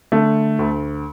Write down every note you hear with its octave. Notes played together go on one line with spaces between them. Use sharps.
D3 A3
D2